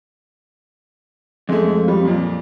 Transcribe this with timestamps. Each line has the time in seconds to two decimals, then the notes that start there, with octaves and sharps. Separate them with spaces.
1.49 F2 G#3 A3
1.88 G3
2.05 F2 A#2